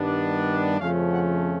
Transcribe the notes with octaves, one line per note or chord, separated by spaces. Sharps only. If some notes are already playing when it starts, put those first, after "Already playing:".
Already playing: G2 D#3 G3 B3 D4
F2 C#3 F3 A3 C#4 F5
F#5